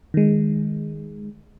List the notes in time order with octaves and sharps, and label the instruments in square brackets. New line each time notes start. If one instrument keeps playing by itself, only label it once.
[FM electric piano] D#3 G#3